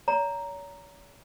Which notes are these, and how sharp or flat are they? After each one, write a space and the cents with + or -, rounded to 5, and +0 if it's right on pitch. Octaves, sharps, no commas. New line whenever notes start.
C#5 +40 A#5 -5